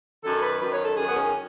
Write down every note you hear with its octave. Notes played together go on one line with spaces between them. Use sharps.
F#2 D#3 A4
B4
F#2 D#3 B4
C#5
A4
F#2 D#3 G#4
B3
C#4